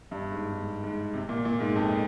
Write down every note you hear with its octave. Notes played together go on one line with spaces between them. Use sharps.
G2
G#2
G#2
G#2
C3
A#2
A#2
G#2
F2